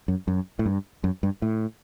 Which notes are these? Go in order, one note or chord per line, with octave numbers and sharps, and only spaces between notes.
F#2
F#2
A2
G2
F#2
G2
A2